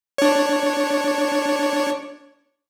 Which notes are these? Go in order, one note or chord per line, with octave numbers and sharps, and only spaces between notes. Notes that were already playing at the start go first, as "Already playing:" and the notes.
D4 C#5